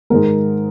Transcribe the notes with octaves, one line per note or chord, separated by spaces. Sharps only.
G#2 D#3 G#3 A#4